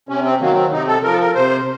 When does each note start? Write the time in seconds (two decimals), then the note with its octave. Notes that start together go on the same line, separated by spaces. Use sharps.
0.09 C3 C#4
0.24 C4
0.41 D#3 F#3 A#3
0.56 C4
0.72 C3 D#4
0.87 A4
1.03 F3 A#4
1.12 A4
1.20 A#4
1.35 C3 C5